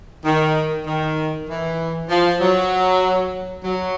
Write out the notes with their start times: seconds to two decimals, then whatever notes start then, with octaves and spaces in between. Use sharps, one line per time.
0.24 D#3
0.85 D#3
1.48 E3
2.09 F3
2.40 F#3
3.64 F#3